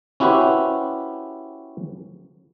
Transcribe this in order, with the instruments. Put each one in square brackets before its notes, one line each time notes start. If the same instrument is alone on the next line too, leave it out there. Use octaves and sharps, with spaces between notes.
[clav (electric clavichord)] C#4 E4 F#4 G4 B4 C5